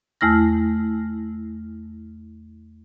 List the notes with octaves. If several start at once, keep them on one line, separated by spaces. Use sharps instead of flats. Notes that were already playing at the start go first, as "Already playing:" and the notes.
E2 A3 E4 F6 A#6